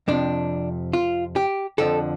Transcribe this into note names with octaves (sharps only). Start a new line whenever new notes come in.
F2 C3 F3 D4
F4
G4
F2 D3 F3 A4